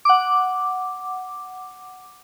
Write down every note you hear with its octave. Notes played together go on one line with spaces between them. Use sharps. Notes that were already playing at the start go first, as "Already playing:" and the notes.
F#5 D6